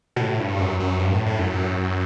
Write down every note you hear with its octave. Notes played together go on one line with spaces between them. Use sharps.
B2
A2
G2
F#2
F#2
G2
A2
A2
F#2